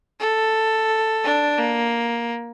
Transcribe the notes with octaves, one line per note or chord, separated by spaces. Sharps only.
A4
D4
A#3